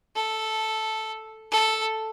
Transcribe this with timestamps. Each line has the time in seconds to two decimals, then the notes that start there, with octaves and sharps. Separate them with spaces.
0.16 A4
1.52 A4